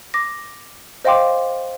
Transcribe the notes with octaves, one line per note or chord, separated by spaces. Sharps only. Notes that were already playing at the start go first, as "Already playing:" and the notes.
D6 A#6
C5 D#5 F5 G5 C6 D6